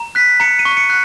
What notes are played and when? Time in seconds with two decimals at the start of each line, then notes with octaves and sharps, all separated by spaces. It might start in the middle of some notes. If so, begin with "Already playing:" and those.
Already playing: A#5
0.15 F#6 B6
0.40 A#5 C#7
0.59 D#7
0.65 C#6
0.77 C#7
0.90 F#6